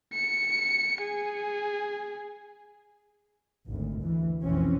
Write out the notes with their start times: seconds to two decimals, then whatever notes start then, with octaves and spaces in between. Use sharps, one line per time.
0.14 C#7
1.02 G#4
3.68 G#1 D2
4.00 D2 E3
4.42 F1 B1 F2 E3 C4 C#4